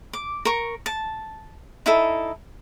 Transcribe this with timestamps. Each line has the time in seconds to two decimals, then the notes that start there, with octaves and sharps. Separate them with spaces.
0.13 D6
0.45 A#4 C#6
0.86 A5
1.86 D#4 E4 A4